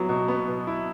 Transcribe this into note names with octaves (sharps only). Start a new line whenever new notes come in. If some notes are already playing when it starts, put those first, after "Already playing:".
Already playing: F#3 B3 E4
B2
B3
B2
E4